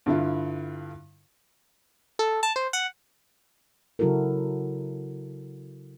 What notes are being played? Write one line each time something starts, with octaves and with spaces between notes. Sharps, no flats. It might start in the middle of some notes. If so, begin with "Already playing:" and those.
G2 D3 E4 F4
A4
A5
C5
F#5
C#3 F#3 E4 F#4 A4 A#4